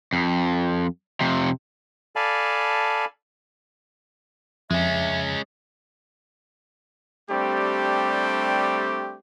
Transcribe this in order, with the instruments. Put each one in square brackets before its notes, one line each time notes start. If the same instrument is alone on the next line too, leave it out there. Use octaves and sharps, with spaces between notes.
[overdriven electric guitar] F2
F2 C3
[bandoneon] A4 D5 F5 G#5 A5 B5
[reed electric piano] F2 [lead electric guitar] G#3 C#4 [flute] E5
[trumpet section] G3 A3 C4 D4 G4